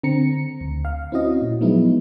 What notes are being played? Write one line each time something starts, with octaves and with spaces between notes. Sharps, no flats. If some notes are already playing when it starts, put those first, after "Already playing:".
D3 C4 A#5 C#7
D2
F5
C4 C#4 E4 F#4 D#5
A#2
F3 F#3 G#3 B3 D#4 E4